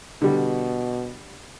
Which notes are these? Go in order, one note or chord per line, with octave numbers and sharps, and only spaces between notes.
B2 D3 G3